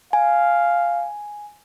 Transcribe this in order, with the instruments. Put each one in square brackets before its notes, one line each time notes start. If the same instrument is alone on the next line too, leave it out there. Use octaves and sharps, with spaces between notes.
[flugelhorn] F5 [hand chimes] G#5